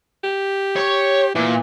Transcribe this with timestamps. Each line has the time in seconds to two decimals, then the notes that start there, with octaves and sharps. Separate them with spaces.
0.24 G4
0.76 C#5
1.35 A#2 E3